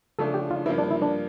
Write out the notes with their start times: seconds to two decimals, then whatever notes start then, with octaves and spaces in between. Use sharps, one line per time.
0.19 C#3 F3 A3 D4 A4
0.34 G4
0.51 F4
0.66 G2 F3 A#3 E4
0.78 D4
0.91 E4
1.02 D4